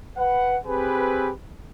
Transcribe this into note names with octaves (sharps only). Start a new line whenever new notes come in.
B4 F#5
C4 G4 G#4 B4